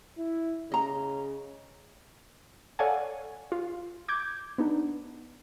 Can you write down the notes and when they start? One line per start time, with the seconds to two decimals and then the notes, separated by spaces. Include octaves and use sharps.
0.18 E4
0.72 C#3 D#5 A#5
2.79 A4 C#5 D5 F5 F#5 G#5
3.52 F4
4.08 D6 G6 G#6
4.58 B3 D4 D#4